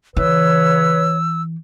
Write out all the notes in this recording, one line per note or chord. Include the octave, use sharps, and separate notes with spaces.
C#3 E3 B4 C#5 E6